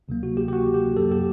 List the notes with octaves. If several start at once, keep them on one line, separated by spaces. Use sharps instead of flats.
D2 C3 F#3 A#3
F#4
G4
G4
F#4
G4
F#2 F#3 A#3 A4
G4